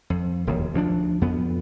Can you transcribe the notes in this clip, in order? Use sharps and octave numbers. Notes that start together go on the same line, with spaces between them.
F2
E1 D#2
D2 F3 C4 D4
F2 B3